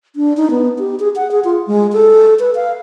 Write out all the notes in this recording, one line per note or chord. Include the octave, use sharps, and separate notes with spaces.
D4
D#4
B3
G4
G#4
F#5
G#4
F4
G#3
A4
B4
F5